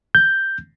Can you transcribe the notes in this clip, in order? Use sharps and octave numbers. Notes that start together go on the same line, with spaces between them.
G6